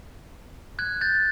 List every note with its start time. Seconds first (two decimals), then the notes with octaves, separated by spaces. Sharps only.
0.79 F#6 G#6
1.01 G6 A6